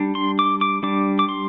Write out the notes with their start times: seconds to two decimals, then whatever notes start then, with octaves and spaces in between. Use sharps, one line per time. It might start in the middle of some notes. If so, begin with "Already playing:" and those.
Already playing: G3 D4
0.15 C6
0.39 D6
0.61 D6
0.83 G3 D4 D6
1.19 D6
1.29 C6